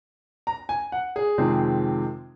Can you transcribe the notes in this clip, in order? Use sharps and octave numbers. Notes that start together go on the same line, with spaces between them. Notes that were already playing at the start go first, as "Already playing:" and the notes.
A#5
G#5
F#5
G#4
F2 C3 D#3 G#3 C4